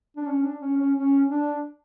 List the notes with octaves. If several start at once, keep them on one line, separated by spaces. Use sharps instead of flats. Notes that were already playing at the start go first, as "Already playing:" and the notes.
D4
C#4
D4
C#4
C#4
C#4
D4